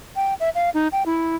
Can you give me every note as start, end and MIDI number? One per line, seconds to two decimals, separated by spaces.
0.16 0.34 79
0.40 0.50 76
0.55 0.70 77
0.74 0.88 63
0.92 1.03 79
1.06 1.36 64